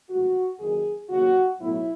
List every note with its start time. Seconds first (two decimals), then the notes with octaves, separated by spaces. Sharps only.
0.09 A1 G#2 D#3 F#3 F#4
0.59 F#1 F#2 D#3 G#4
1.09 D#2 C#3 F#3 F#4
1.59 B1 A2 F#3 E4